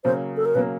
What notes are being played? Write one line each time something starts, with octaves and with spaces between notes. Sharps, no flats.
C#3 F#3 A#3 C5
A4
A#4
C#3 F#3 A#3 B4